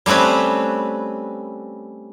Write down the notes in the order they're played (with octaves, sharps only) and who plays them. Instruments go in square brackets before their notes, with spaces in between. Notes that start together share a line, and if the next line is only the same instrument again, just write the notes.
[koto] G3 A3 C4 C#4 B4